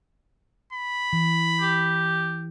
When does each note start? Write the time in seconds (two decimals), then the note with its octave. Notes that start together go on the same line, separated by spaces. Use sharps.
0.73 B5
1.13 E3
1.60 G4